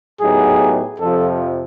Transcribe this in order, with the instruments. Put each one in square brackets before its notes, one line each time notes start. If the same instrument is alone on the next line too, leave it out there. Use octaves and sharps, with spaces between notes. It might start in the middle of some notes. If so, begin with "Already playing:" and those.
[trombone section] A2 F#3 B3 D#4 G4 [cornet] G#4
[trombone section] F2 C3 F3 [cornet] A4